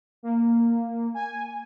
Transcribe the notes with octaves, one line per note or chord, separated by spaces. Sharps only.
A#3
G#5